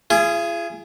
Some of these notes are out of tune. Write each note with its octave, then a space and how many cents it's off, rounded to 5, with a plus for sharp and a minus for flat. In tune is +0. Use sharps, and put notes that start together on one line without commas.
F4 -45 G#4 +0